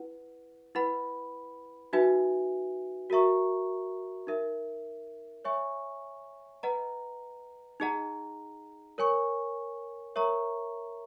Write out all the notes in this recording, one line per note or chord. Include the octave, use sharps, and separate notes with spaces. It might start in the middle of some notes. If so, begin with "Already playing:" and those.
Already playing: E4 B4 F#5
E4 B4 F#5 B5
D#4 F#4 B4 E5 G#5
F#4 A#4 E5 A#5 C#6
D#4 A#4 E5
C#5 E5 G#5 C#6
B4 D#5 F#5 A#5
D#4 G#4 D#5 F#5 A#5
A#4 C#5 G#5 C#6
A#4 C#5 E5 A#5 C#6